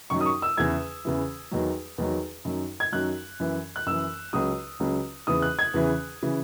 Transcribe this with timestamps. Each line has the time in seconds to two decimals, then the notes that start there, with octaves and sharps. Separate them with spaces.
0.10 F#2 D#3 F#3 C#6
0.21 D#6
0.26 C#6
0.42 E6
0.57 E2 C#3 E3 G#6
1.05 E2 C#3 E3
1.51 E2 D#3 F#3
1.98 E2 D#3 F#3
2.45 F#2 D#3 F#3
2.80 G#6
2.92 F#2 D#3 F#3 F#6
3.40 F#2 E3
3.76 F#6
3.86 F#2 E3 E6
4.33 C#2 C#3 F#3 D#6
4.80 C#2 C#3 F#3
5.27 E2 C#3 E3 D#6
5.42 F#6
5.59 G#6
5.74 E2 C#3 E3
6.23 C#3 E3